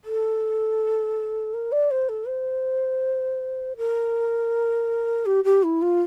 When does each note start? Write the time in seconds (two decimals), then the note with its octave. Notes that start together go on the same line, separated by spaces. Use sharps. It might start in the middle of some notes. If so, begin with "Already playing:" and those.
0.05 A4
1.54 A#4
1.72 D5
1.91 C5
2.09 A4
2.28 C5
3.77 A#4
5.26 G4
5.44 G4
5.63 E4
5.82 F4